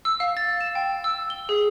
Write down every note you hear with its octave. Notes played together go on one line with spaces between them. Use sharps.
E6
F5
A6
E7
G5
E6
G7
G#4